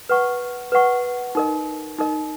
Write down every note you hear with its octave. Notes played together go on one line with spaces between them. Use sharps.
B4 F#5 C#6
B4 F#5 C#6
D#4 A#4 D#5
D#4 A#4 D#5